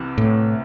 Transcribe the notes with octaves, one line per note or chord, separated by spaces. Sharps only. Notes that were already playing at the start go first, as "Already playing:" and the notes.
Already playing: C2 C3 E3
A2